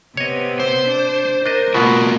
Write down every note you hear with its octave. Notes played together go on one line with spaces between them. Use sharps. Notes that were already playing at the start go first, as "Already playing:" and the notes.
C3 B3 C#5 D#5
C5
D4
D4 A#4 D#5
B2 A#3 B3 F4 F#4